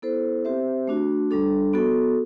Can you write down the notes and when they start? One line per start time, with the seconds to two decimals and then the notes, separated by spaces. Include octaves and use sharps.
0.02 B3 E4 A4 C5
0.45 C4 G4 C5 E5
0.87 A3 D4 F#4
1.31 G3 D4 A4
1.73 B3 F#4 A4